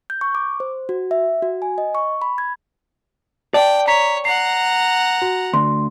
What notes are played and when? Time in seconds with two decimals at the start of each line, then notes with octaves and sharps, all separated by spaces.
0.10 G6
0.21 C#6
0.35 D6
0.60 C5
0.89 F#4
1.11 E5
1.42 F#4
1.62 G#5
1.78 D#5
1.95 C#6
2.22 B5
2.38 G#6
3.54 D5 G5 A5
3.88 C#5 A#5 B6
4.25 F#5 A#5 C7
5.22 F#4
5.53 D2 C6